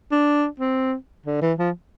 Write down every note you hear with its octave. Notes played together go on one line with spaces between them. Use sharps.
D4
C4
D3
E3
F3